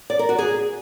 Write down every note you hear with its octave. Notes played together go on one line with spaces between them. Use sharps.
D5
A#4
F#4
G#4